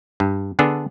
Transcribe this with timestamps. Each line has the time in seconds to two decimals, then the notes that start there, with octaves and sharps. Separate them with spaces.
0.20 G2
0.59 D3 B3 D4 G#4 A4